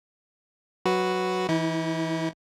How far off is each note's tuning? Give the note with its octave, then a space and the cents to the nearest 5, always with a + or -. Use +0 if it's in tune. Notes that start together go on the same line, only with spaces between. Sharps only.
F#3 +0 F#4 +0 B4 +0
E3 +0 E4 -45